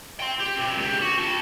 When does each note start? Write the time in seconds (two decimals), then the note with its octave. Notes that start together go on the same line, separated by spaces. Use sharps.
0.20 G5 C6
0.40 G4
0.56 B2 C4
0.76 C#2 G4
1.01 F#4
1.18 C4 A5